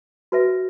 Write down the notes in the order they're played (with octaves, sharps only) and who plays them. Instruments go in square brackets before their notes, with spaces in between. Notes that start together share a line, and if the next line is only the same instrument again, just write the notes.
[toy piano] F#4 B4 E5